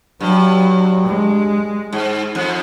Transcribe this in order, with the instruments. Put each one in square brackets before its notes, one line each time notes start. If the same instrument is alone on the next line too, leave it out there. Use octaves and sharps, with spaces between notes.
[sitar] G2 [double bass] F#3
[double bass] G#3
[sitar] G#2
F2